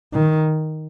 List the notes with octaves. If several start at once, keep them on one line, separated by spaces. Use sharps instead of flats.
D#3